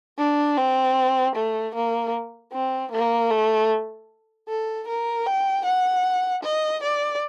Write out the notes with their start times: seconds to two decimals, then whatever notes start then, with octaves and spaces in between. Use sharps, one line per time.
0.19 D4
0.57 C4
1.36 A3
1.75 A#3
2.53 C4
2.92 A#3
3.31 A3
4.48 A4
4.88 A#4
5.26 G5
5.65 F#5
6.43 D#5
6.83 D5